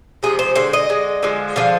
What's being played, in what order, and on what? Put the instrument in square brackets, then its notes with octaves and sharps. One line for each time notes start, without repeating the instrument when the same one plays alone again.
[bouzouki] C3 F3 G#3 G#4
C5
D3 G#3 C5
D#5
D3 G#3
D3 F3 G#3
D3 F3 G#3 F5